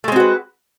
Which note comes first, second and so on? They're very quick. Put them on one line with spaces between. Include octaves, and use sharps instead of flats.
A3 G#3 C4 F#4 B4